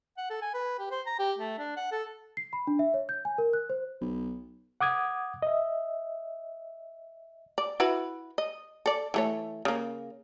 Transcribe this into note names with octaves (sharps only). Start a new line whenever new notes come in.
F#5
A4
G#5
B4
G4
C5
A#5
G4
A3
D4
F#5
A4
C7
B5
D4
E5
C#5
G6
G#5
A#4
F#6
C5
B1
F#5 D6 D#6 G#6
D#5 E5
D5
E4 F#4 B4
D#5
A4 D5
E3 A3 C#5
C#3 A#3